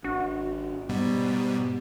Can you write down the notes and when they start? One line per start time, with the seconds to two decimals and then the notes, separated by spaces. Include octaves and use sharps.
0.04 G#1 D4 F#4
0.89 G#2 B2 G3 B3